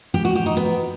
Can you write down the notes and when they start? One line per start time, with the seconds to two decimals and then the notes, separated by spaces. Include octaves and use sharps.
0.14 G4
0.25 F#4
0.35 G4
0.46 D#4
0.57 B3